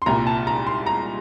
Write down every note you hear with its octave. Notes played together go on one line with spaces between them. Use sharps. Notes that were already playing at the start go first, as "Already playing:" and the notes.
C6
C2 A#2 G3 A#5
A5
A#5
C6
A#5